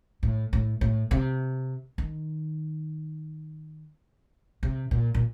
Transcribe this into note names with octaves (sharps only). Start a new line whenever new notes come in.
A2
A2
A2
C3
D#3
C3
A#2
A#2